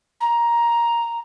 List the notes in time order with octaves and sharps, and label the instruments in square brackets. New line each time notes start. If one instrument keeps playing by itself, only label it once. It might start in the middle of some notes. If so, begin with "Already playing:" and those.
[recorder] A#5